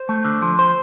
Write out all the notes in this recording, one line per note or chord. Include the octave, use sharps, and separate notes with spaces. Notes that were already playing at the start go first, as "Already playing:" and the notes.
Already playing: C5
A3
D3
F3
C5